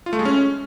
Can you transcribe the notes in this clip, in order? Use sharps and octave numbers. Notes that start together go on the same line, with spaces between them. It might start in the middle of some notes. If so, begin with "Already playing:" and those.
F4
A3
G#3
C#4